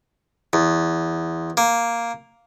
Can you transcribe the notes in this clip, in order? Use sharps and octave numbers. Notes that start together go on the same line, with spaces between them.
E2
A#3